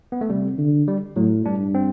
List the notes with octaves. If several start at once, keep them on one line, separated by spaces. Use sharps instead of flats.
B3
A3
C3 G3
D3
G3
A2 F#3
G2 D4
C4